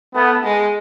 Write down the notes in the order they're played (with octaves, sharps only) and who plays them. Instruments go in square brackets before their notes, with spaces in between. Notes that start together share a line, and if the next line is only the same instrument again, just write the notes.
[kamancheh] A3 [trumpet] B3
[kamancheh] G#3